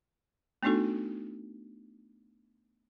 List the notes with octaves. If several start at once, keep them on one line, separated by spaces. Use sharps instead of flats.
A3 B3 D4 D#4 F#4 A4